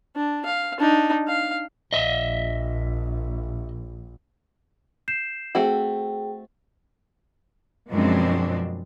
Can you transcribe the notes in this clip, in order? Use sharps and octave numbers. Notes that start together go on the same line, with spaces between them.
D4
F5
D4 D#4
F5
A#1 D#5 E5
G6 C7 E7
A3 C4 F#4 G#4 G5
F#2 B2 F3 G#3 C4 D4